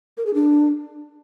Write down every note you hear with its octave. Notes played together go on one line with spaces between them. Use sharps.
A#4
G#4
D4